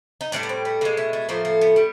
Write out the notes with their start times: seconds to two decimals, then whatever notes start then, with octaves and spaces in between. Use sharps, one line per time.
0.21 D#4
0.32 A2 E3 G3 D4
0.43 B3
0.49 C4
0.65 B3
0.81 B2 G#3 A#3
0.97 A3
1.13 A3
1.29 A2 F3 A3 A#3
1.45 A#3
1.61 B3
1.76 G3